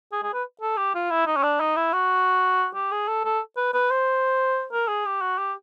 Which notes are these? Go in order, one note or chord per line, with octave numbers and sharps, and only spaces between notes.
G#4
G#4
B4
A4
G4
F4
E4
D#4
C#4
D4
D#4
E4
F#4
G4
G#4
A4
A4
B4
B4
C5
A#4
G#4
G4
F#4
G4